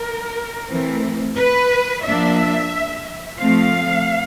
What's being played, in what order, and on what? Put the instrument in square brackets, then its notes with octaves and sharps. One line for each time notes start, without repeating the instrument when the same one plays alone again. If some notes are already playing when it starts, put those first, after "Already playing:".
Already playing: [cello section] A#4
E3 A3 C4
B4
F3 A#3 D4 E5
F3 A3 C4 F5